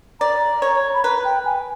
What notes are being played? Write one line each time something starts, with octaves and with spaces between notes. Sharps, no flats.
D5 A#5
C#5
B5
B4 A#5
G5
G#5